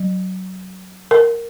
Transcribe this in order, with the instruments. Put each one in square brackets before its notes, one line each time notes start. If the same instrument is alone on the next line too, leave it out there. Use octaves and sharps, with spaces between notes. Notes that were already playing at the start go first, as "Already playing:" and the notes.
Already playing: [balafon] F#3
A#4